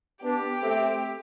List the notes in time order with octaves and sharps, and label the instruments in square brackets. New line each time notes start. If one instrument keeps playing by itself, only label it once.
[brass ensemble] B3 D4 [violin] G4
[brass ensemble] A3 C4